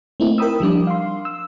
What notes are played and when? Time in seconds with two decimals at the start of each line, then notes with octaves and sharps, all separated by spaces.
0.20 A3 A#3 C4 D#4 E4
0.38 A#4 G5 B5 D#6 E6
0.60 F3 G3 D4 D6
0.87 F5 C6
1.25 E6